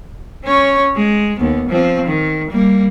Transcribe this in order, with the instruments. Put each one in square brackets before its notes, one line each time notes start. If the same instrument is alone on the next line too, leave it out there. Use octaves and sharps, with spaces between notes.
[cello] C#4 C#5
G#3
D#2 B3
F3 C4
D#3
G3 A#3